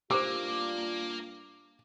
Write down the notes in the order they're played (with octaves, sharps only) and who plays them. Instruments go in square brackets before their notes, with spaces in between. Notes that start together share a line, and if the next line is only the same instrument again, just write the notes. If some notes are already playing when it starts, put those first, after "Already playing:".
[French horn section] G2 D4 F4 [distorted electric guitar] A#3 [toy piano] G4 A#4 C5 [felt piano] D6